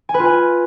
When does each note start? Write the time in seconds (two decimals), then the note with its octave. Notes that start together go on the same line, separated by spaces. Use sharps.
0.09 G#5
0.14 B4
0.19 F4
0.25 G#5